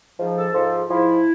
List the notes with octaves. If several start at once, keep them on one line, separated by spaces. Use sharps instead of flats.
G#2 F3
A4
G#2 F3 A4
G#2 F3 E4